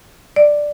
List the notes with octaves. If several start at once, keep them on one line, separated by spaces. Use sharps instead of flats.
D5